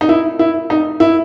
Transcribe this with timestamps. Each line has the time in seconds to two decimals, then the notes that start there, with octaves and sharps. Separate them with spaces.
0.01 D#4
0.09 E4
0.39 E4
0.70 D#4
1.00 E4